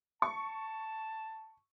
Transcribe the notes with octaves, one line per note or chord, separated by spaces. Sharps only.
A5 C#6